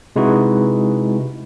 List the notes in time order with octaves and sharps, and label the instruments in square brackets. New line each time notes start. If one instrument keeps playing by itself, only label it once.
[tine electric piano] C3 G#3 D#4 E4 F#4 B4